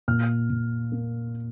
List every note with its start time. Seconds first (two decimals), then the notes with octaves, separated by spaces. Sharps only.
0.08 A#2 F6
0.50 A#2
0.92 A#3